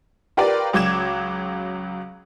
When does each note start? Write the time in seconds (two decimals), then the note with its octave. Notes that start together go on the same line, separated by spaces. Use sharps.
0.37 F4 G4 A#4 B4 D5
0.73 C#2 F#3 D6 G#6 E7